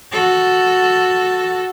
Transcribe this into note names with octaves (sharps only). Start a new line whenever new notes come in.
F#4 A4